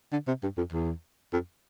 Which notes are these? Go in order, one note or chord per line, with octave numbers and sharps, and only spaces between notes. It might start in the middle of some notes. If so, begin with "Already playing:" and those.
D3
C3
G2
F2
E2
F2